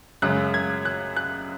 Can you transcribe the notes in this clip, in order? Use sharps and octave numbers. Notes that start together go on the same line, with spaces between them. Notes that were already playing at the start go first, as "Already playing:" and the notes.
F#2 C#3 G#3 F#6
G#6
F#6
F#6